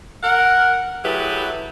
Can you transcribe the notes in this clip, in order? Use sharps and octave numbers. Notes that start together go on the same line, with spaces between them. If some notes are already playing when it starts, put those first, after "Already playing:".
A#4 F#5
F#3 A3 E4 G4 G#4 B4